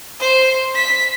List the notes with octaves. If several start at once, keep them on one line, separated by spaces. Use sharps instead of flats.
C5
B6